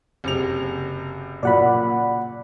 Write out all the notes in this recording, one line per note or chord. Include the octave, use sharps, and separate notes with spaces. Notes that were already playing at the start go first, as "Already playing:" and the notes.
F#1 C3 F7
A#2 F#3 D5 F#5 B5